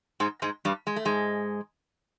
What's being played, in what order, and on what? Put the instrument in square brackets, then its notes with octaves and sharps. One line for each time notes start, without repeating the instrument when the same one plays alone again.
[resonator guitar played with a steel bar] G#2 G#3
G#2 G#3
G2 G3
G#3
A3
G#2 G#3